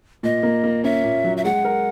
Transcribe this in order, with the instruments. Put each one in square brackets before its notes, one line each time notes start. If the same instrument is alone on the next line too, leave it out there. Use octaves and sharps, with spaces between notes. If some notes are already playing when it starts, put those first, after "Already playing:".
[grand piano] A#2 [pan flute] D#5
[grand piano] A#3
A#3
[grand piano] C#4 [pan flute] E5
[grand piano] A#2
F#3
[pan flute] E5
[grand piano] G#3 [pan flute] F#5
[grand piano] A#4